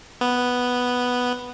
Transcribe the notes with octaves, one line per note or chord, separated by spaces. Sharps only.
B3